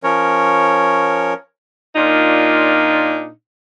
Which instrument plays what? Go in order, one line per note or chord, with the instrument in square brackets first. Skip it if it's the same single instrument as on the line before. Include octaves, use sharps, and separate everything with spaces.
[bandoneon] F3 C#4 A#4 C#5
[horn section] A#2 A#3 D4 D#4 F4